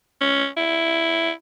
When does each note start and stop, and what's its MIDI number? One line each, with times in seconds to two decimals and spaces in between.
0.21 0.47 61
0.57 1.30 64